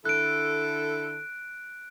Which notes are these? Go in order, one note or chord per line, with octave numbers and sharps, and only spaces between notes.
D3 E4 A4 F#6 D7